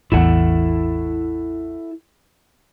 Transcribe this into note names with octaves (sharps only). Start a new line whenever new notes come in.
A1 E2 E4 A4 F#5